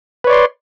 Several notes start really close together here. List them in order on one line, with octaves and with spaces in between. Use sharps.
B4 C#5 D5 C6